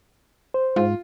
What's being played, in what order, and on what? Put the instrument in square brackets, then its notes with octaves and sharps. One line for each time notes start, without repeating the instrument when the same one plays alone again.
[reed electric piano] C5
[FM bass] G#2 [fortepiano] F4